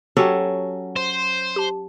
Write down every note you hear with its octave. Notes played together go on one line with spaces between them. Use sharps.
F#3 C#4 G4 A4 G5
C5
G4 A5